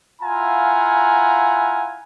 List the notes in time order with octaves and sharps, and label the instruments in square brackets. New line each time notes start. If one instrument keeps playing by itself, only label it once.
[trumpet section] E4 F4 F5 F#5 G#5 A#5